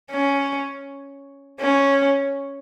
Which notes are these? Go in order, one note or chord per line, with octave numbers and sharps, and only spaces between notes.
C#4
C#4